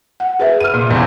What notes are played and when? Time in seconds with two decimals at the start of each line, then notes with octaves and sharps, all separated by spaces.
0.20 F#5
0.40 G#4 B4 E5
0.60 F6 D#7
0.74 A#2
0.89 A1 E2